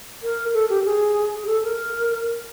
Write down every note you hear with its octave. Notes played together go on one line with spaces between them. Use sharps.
A#4
A4
G4
G#4
G#4
A4
A#4